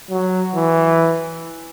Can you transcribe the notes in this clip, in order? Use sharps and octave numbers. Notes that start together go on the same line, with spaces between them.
F#3
E3